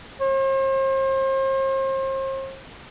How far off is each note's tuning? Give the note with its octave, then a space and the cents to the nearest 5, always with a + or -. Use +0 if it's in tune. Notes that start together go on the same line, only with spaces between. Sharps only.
C5 +40